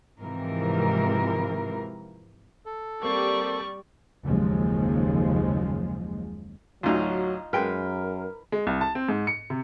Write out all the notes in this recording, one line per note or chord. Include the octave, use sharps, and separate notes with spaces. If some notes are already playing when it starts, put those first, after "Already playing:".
G#2 C3 E3 F3 A#4
A4
G3 A#3 C4 D5 C#6
F#1 D#2 C#3 F3 G#3
A1 D2 F#3 D#4 F4 F#4
F#2 G#3 A#4 B4 G5 F6
G#3
C2
A5
C4
G#2
C#7
C3